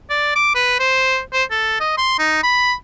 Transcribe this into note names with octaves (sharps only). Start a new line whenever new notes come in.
D5
D6
B4
C5
C5
A4
D#5
C6
D#4
B5